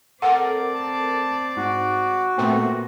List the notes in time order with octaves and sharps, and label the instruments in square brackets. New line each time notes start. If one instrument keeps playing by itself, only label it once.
[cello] C4 D5 [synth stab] A4 A#4 [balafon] F#5
[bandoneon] A5
[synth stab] G#2 [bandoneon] F#4
[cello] A#2 [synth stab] A3 B3 C4